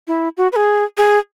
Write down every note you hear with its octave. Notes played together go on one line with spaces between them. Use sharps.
E4
F#4
B4
G#4
G#4